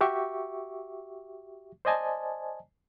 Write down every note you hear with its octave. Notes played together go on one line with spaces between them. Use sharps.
F#4 G4 E5 C#6 D6
C5 D5 D#5 G#5 A5